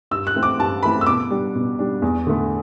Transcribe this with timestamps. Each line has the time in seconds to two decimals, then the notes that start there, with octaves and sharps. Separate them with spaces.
0.11 G2 E6
0.27 F#6
0.36 E3 A3 C4
0.43 D6
0.59 G2 A5
0.83 E3 A3 C4 B5
1.01 E6
1.06 B2 D6
1.31 G3 D4
1.55 B2
1.79 G3 D4
2.02 E2
2.27 D3 A3